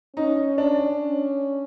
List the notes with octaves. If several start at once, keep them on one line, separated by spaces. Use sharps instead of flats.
C#4 D#4
D4
C#4